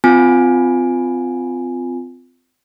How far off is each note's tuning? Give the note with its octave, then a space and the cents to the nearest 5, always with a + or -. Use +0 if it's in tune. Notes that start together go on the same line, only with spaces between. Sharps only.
C4 -30 F4 +0 G#5 +0